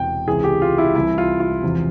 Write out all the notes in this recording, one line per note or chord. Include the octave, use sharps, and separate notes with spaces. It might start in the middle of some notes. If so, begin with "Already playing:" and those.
Already playing: E1 E2 C3 G5
C#2 C3 E3 G#4
G4
F4
E4
C2 C3 E3 E4
F4
F4
E1 E2 C3 F3